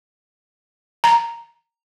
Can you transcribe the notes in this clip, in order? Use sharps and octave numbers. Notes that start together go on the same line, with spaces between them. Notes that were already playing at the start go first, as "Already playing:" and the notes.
A#5